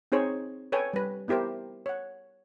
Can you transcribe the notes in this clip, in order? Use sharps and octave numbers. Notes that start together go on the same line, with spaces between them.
C4 D#4 G#4 C5 C#5
A4 B4 C#5 G5 G#5
G3 B4
B3 E4 G4 A#4 C5
C#5 F#5